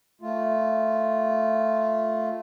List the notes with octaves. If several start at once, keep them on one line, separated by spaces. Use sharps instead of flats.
A3 F4